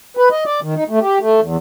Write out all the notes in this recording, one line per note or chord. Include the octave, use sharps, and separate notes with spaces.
B4
D#5
D5
D#3
D#4
A3
G4
A3
E2